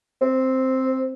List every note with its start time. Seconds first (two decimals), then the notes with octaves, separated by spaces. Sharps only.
0.21 C4